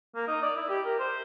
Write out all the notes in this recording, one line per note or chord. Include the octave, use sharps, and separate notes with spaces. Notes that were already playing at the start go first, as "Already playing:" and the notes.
A#3
D#4
D5
E4
G4
A#4
C5